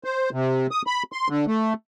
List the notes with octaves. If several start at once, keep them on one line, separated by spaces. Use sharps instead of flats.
C5
C3
D#6
B5
C6
D3
A3